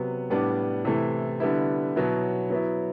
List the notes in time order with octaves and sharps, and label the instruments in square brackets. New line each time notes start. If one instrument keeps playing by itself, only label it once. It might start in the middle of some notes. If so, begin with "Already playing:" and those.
Already playing: [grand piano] C3 F#3 B3
A2 G3 B3 D4
C3 E3 A3 E4
D3 G3 B3 E4
B2 F#3 B3 E4
F#3 B3 E4